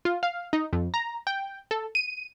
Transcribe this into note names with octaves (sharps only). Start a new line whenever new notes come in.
F4
F5
D#4
F2
A#5
G5
A4
D#7